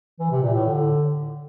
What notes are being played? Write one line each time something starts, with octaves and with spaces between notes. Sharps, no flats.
E3
C3
A#2
A2
D3